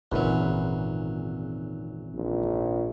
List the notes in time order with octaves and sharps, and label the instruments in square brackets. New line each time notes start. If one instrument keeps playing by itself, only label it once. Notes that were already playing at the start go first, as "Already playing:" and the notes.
[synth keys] G#1 [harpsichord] E2 F#3 [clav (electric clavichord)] A#2 C#3 B4
[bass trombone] A#1